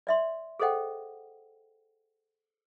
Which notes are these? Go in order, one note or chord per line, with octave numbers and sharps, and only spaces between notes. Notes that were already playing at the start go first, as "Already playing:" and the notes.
D5 E5 C6
G#4 A4 C5 D#5 F#5 G5